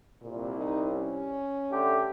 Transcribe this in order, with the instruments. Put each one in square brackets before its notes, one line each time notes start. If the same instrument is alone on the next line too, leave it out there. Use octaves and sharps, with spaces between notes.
[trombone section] C2 [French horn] A#2
[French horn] D#4
C#4
[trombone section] D3 A3 G4